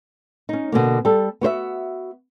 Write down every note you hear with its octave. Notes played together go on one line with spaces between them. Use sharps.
C#4 D#4
B2 D3 A#3
G3 A4
B3 F#4 C5 E5